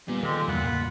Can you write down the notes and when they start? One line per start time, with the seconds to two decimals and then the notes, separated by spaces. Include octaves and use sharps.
0.08 A#2 G3 B3
0.23 D#3 G3 G#3 C4 G4 A4
0.48 E2 G2 C#3 F#3 A3 F4 F#5 B5
0.65 A2 C#3 A#3